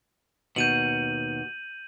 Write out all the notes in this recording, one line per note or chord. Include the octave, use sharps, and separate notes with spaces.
D#2 B2 G6 D#7 F#7